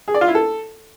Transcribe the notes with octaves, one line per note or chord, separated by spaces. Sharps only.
G#4
D5
F4
E4
A4